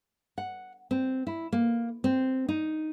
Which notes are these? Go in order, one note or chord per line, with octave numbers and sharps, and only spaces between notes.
F#5
C4
E4
A#3
C4
D#4